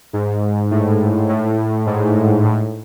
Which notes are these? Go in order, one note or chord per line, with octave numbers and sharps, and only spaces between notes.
G#2
A2
A2
G#2
A2